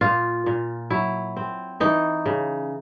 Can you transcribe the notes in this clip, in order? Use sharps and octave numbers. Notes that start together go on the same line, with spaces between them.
A#2 F4
A#2
F#3 E4
C4
E3 D#4
C#3